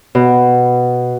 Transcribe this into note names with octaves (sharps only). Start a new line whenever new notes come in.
B2